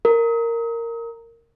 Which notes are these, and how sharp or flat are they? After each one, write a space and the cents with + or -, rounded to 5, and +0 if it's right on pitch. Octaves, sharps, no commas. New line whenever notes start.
A#4 -10